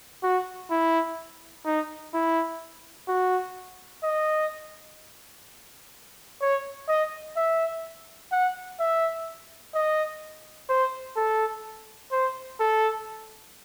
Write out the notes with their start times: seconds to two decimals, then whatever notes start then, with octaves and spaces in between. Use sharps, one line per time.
0.23 F#4
0.71 E4
1.66 D#4
2.14 E4
3.08 F#4
4.04 D#5
6.42 C#5
6.89 D#5
7.37 E5
8.32 F#5
8.80 E5
9.75 D#5
10.69 C5
11.17 A4
12.12 C5
12.60 A4